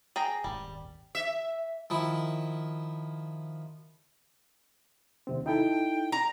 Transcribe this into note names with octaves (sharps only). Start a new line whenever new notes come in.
G#4 G5 A#5
D#1 G#1 G3
E5
D#3 F3 E4
D#2 C3 C4
D#4 E4 A4 G5
A#5